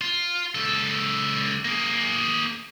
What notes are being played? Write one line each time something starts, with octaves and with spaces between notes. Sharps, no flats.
F4
C#2 A4
A#3 G#4